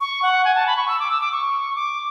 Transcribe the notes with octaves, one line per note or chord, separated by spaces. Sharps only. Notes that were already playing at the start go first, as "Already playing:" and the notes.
C#6
F#5
G#5
A5
B5
C#6
E6
D6
E6
D6
C#6
D6